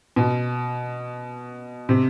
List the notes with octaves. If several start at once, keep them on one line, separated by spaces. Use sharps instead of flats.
B2
C3